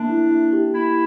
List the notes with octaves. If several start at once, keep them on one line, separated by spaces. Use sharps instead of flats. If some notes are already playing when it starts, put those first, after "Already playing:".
Already playing: A#3 D4
E4
A#3
G4
A#3 E4